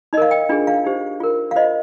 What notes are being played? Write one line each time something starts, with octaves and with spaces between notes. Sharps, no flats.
D#4 A#4 D#5 F5
G5
D4 F4 G#4
F5
D#4 G4 C5
F4 A#4
F5
F4 C5 D#5